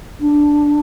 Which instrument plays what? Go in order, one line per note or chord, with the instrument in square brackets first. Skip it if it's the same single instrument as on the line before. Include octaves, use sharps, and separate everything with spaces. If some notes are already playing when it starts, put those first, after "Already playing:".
[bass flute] D4